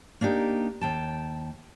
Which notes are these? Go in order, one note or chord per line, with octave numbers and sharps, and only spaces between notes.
A#3 D4 D#4 G4 A#4
D#2 G5 A5